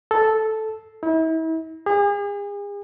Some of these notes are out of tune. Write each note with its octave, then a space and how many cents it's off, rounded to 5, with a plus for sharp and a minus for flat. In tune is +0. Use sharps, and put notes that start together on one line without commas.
A4 -5
E4 -40
G#4 -40